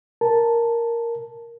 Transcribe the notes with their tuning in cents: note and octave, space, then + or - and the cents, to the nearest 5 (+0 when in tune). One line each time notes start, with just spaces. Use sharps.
A#4 +0 A5 +0